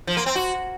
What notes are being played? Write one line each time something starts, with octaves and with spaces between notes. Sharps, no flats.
F3
A#3
C4
F#4